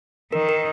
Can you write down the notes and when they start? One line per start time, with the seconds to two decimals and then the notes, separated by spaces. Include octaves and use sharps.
0.32 D#3 A#4
0.49 A#4